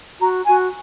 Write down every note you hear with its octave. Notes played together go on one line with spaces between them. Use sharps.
F#4 A#5
F#4 G#5